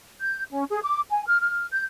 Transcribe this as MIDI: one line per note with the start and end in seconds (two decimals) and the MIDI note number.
0.20 0.42 91
0.50 0.64 61
0.70 0.81 68
0.83 1.00 86
1.10 1.24 80
1.27 1.37 89
1.41 1.66 89
1.71 1.83 91